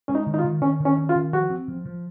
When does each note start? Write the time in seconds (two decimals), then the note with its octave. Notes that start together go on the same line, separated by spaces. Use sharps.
0.08 G#3 C#4
0.15 D#4
0.27 D#3
0.34 D#4
0.39 F4
0.44 D#3
0.62 D#3 C#4
0.80 D#3
0.85 C#4
0.97 C#4
1.09 F4
1.15 D#3
1.33 F3 F#4
1.50 C4
1.68 F3
1.85 F3